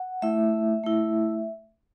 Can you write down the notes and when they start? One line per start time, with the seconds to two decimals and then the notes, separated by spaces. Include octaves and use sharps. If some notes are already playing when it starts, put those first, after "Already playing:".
Already playing: F#5
0.22 A3 E4 E5
0.84 A3 E4